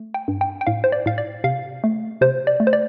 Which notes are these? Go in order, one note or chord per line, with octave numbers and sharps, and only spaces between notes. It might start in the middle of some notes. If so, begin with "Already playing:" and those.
Already playing: A3
G5
G2
G5
G5
A2 F5
C5
D5
A2 F5
D5
C3 F5
A3
C3 C5
D5
A3
C5
D5